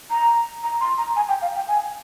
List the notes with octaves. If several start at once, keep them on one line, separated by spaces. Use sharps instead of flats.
A#5
A#5
C6
A#5
G#5
G5
F5
G5
G#5